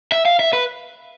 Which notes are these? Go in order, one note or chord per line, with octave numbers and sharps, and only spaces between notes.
E5
F5
E5
B4